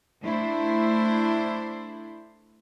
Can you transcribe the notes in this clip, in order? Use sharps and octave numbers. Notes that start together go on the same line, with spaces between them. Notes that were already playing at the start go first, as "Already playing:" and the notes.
A3 D4 E4 C5